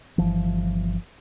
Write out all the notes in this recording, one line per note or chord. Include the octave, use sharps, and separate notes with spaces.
G1 E3 F3